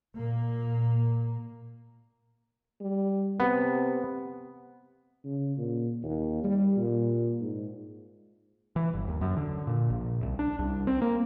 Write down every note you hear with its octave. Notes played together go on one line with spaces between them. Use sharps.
A#2 A#3
G3
C3 B3
C#3
A#2
D#2
G3
A#2
G#2
E3
G1
D#2
F#2
D3
A#2
A#1
C2
D4
C2
C4
A#3